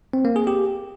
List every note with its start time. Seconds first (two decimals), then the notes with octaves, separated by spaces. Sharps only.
0.13 C4
0.25 A#3
0.36 G#4
0.47 G4